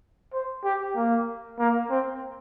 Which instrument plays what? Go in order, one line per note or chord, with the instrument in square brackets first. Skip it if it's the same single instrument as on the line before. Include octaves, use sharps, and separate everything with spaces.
[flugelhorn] C5
G4
A#3
A#3
C4